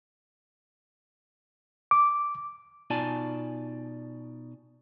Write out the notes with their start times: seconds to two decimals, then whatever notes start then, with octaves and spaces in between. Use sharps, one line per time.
1.91 D6
2.90 B2 D#4 F4 D5 G#5 A5